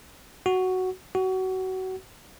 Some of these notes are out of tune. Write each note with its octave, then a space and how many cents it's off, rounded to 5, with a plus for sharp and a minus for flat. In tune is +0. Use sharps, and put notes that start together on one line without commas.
F#4 +5
F#4 +25